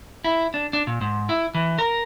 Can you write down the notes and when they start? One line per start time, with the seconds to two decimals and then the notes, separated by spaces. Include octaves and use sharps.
0.24 E4
0.54 D4
0.73 D4
0.87 A#2
1.01 G#2
1.29 E4
1.55 E3
1.79 A#4